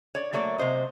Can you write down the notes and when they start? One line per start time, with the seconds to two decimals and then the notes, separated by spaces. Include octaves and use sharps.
0.15 C#5 D5
0.33 F#3 A3 A#3 C#5 D5
0.58 C3 F#3 C5 D#5